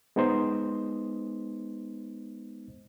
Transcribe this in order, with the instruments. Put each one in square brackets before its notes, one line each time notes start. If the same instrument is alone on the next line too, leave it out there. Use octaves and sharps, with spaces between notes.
[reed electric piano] G#3 B3 D#4 C5 D#5